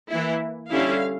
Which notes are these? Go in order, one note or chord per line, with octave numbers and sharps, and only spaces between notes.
E3 A#3 E4
D3 G3 C#4 E4 F5